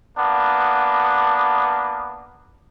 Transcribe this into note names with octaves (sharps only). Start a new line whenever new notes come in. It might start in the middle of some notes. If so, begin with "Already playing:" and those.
A#3 B3 D4